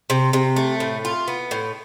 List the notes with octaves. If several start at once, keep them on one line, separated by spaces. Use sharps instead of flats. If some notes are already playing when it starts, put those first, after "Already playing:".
C3
C3
A3
A2
F4
B3
A2